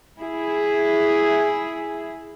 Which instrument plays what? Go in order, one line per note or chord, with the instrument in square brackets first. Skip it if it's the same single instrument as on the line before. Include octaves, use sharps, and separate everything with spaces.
[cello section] E4 G#4